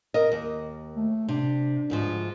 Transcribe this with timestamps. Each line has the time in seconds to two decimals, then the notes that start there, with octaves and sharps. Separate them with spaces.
0.14 A#4 D#5
0.32 D#2
0.96 A3
1.29 C3 D4
1.90 D2 G#2 F3